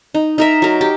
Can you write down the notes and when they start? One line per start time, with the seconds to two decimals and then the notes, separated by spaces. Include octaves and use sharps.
0.14 D#4
0.38 D#4 A#4 E5
0.62 F#3 A#4
0.81 G4